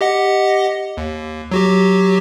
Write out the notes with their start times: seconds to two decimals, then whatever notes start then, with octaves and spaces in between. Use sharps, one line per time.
0.01 G4 D#5 F#5
0.97 D#2
1.51 F#3 F#4 G4